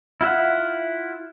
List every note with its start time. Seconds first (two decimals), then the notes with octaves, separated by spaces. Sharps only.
0.21 E4 F4 E5 F#5